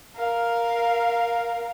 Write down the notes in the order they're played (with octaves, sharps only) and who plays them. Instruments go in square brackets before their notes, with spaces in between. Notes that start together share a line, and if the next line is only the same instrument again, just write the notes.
[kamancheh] A#4 F5